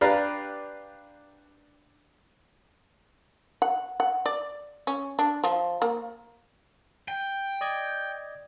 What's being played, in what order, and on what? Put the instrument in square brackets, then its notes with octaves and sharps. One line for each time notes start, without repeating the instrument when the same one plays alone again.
[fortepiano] D4 G4 B4 D5 F5 A#5
[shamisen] F#5
F#5
D5
C#4
D4
F3
A#3
[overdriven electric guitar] G5
[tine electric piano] D5 D#5 G#6